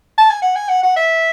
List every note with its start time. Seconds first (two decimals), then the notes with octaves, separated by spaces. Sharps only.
0.18 A5
0.30 G#5
0.42 F#5
0.56 G#5
0.69 F#5
0.83 F#5
0.96 E5